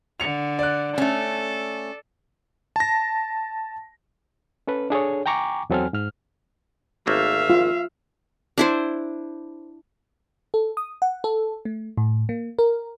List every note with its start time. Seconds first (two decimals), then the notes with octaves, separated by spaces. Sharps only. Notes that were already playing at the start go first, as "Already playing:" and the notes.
0.20 D3 C#7 F7
0.59 D5 F#6
0.98 A3 C#4 A4
2.76 A5 A#6
4.67 C#4 A4 B4
4.90 D4 G#4 A4 C#5
5.26 G5 G#5 A#5 C#6 D6
5.70 E2 F#3 C4 A4 G#5 F6
5.93 G#2 F6
7.07 G#1 A3 A#3 E5 F5
7.50 F4
8.58 D4 E4 C5
10.54 A4
10.77 D#6
11.02 F#5
11.24 A4
11.65 A3
11.97 A2
12.29 A#3
12.59 A#4